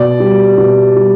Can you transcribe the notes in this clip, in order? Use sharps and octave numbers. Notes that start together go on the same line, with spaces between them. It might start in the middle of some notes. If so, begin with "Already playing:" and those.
Already playing: B2 D5
G3
B2
G3